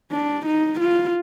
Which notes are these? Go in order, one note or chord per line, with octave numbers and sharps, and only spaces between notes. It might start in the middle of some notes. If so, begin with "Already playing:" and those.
D4
D#4
F4